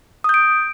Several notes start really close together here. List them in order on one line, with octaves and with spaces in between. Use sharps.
D#6 G6 D7